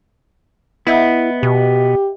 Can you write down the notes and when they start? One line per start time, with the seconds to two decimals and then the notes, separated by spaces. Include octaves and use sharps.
0.87 B3 E4 D#5 E5 F#5
1.43 B2 G4